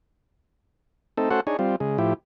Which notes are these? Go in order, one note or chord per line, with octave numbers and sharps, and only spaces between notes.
A3 C4 D#4 A4
A3 C#4 F#4 A4 C5 F#5
D4 D#4 G#4 C#5
G3 C4 F4
C#3 G#3
A2 F3 E4 G4